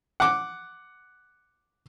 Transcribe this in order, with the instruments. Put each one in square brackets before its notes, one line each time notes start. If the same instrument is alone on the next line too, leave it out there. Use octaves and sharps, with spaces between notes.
[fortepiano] F#5 D6